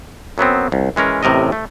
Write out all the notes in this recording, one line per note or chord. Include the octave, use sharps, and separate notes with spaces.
F#2 F#3 B3 C4
C2
E3 G#3 C#4 A#4
A1 A2 C3 A#4 D#5
A3